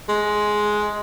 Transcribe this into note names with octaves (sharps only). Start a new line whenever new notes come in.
G#3